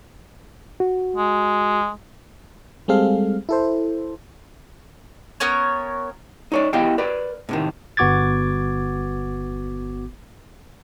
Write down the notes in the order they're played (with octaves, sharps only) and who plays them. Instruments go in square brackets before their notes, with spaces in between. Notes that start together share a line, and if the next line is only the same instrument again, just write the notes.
[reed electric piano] F#4
[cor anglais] G#3
[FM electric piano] G3 G#3 C4 G#4 A4 F5
E4 A4 C5
[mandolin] B3 C#4 A#4 C#5
[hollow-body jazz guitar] D#4 C#5 D5
B3 E4 G4 D#5 F5 G5
A#4 B4 D5
A2 C3 D#3
[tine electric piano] G1 B3 F#4 D6 G#6 A6